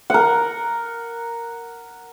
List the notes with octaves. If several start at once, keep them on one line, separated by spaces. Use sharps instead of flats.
A#4 F#5